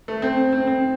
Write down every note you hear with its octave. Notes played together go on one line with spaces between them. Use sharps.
A3
C4
C4
C4